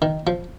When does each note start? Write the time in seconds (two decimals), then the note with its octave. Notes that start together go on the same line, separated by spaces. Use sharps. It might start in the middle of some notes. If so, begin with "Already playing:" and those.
0.02 D#3
0.27 F3